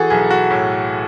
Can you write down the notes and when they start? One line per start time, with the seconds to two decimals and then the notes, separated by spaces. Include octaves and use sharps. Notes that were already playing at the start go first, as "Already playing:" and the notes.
Already playing: E3 F#4 G#4 A4
0.10 B1 G#4
0.30 F#4
0.51 A2